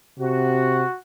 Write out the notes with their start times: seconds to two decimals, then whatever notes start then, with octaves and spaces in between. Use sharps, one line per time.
0.19 C3 F#4